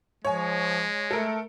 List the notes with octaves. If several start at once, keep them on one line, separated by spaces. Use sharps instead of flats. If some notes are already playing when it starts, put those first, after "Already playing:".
F3 G#3 C#5 G#5
A3 A4 A#4